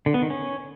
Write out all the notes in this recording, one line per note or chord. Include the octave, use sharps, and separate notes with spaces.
D3
B3
D#3
C#4